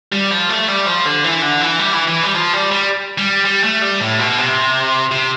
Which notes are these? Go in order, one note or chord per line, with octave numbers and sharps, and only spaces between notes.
G3
F3
A3
G3
F3
D3
E3
D3
E3
G3
E3
E3
G3
F3
G3
G3
G3
G3
A3
G3
A2
B2
C3
C3